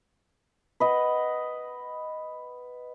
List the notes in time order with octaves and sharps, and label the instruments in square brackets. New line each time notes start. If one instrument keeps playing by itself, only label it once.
[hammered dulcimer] B4 D#5 F#5